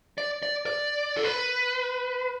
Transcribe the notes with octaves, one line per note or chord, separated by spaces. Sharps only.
D5
D5
D5
A4
B4